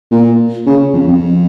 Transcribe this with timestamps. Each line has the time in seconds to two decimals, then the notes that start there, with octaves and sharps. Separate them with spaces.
0.11 A#2
0.66 C#3
0.94 F2
1.08 F2